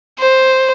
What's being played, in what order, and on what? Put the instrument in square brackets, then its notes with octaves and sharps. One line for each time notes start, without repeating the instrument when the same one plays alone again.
[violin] C5